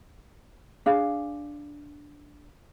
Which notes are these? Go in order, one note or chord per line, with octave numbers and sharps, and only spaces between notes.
D4 G#4 F5